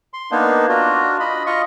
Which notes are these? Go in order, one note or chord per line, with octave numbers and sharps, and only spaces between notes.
C6
A#3 B3 D4 D#4
D4 F4 F#4
D#5 B5
F4 D#5 C#6